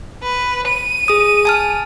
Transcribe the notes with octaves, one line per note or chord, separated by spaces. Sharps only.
B4
D#7
G#4 D#6
G#5 A5 F6